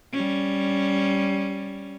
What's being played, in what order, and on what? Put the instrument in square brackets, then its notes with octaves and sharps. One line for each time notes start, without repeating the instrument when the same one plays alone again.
[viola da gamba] G3 C#4